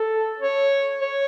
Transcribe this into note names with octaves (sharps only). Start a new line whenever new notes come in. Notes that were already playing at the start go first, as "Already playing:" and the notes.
Already playing: A4
C#5
C#5